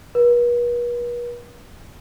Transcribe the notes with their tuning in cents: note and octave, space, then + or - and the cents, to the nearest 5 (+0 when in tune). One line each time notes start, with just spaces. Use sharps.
B4 -45